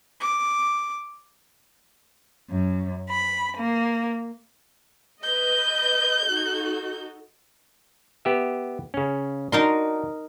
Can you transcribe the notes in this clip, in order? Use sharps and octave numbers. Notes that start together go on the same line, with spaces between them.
D6
F#2
B5
A#3
B4 D#5 G6
D#4 F#4 A4
B3 G4 E5
C#3 C#4
D4 D#4 F#4 A#4 C6